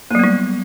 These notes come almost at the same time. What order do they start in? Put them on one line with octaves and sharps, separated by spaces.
A#3 F#3 B3 G3